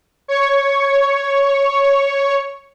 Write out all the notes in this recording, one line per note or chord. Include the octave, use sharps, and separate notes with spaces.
C#5 C#6